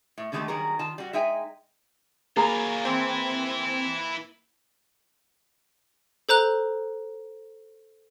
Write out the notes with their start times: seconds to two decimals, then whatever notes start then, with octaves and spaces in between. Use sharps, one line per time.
0.17 A2
0.32 D3 D#3 G#3 A3 G4 A4
0.48 D#3 F#3 G3 G#4 A#4
0.79 D#3 F4 A5
0.98 G3 F#4
1.13 G#3 D#4 E5 G5 G#5
2.37 F#3 A#3 F4 G#4 A#5 B5
2.85 E3 C4 E4
6.29 A4 C5 A#5 F#6